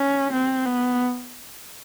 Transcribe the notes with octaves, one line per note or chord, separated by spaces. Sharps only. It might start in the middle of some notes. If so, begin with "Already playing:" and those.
Already playing: C#4
C4
B3